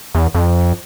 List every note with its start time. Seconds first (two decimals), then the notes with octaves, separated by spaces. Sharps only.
0.15 E2
0.35 F2